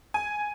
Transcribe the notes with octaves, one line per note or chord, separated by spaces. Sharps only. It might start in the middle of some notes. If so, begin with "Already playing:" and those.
G#5